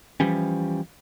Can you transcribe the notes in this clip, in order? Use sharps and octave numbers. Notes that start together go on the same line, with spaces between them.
E3 F3 G3 C#4